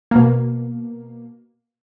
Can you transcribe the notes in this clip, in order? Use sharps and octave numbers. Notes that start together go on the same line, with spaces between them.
B2 A#3